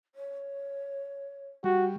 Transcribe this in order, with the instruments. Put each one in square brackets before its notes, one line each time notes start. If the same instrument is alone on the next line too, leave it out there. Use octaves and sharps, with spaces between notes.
[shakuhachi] C#5
[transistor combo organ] G3 [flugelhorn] F#4